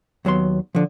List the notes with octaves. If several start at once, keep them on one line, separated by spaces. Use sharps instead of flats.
D#2 F#3 B3 C6
D3 F3